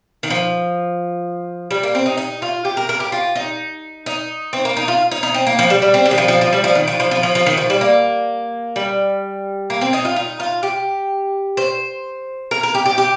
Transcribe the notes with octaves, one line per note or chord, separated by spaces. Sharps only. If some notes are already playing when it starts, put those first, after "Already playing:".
D#3
F3
G3
A#3
C4
D#4
D#4
F4
G4
A#4
A#4
G4
F4
D#4
D#4
C4
A#3
D#4
F4
D#4
D#4
C4
A#3
F3
G3
G3
C4
G3
D#3
F3
F3
F3
G3
F3
D#3
F3
F3
F3
F3
F3
D#3
F3
G3
A#3
G3
A#3
C4
D#4
F4
D#4
F4
G4
C5
A#4
A#4
G4
G4
G4